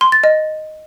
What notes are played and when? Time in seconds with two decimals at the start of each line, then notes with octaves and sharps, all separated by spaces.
0.01 C6
0.12 A6
0.24 D#5